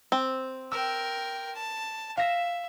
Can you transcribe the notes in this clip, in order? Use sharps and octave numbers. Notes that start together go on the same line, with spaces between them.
C4
A#4 G5 E6
A5
E5 F5 A#6 E7